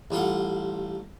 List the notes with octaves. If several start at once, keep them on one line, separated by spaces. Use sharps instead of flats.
A1 G3 F4 F#5